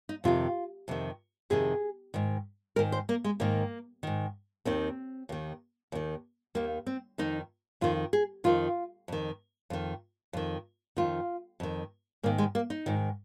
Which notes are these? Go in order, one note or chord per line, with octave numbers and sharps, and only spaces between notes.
D#4
F2 C3 D#3 F4
F2 C3 D#3
F2 C3 D#3 G#4
G#2 D#3
G#2 D#3 A#4
C5
A#3
G#3
G#2 D#3 A#3
G#2 D#3
D#2 D#3 C4
D#2 D#3
D#2 D#3
D#2 D#3 A#3
C4
F2 D#3 D#4
F2 D#3 F4
G#4
F2 D#3 F4
F2 D#3
F2 D#3
F2 D#3
F2 D#3 F4
F2 D#3
G#2 D#3 A#3
G#3
A#3
D#4
G#2 D#3